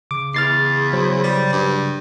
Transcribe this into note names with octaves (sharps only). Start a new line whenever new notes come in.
C#3 D6
E2 F6 A6 C7
F#3 C5
G3
G2 C#3